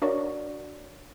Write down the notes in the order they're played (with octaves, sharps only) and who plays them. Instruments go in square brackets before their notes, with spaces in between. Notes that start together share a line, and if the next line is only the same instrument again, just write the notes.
[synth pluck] D4 F#4 A#4 C#5 D5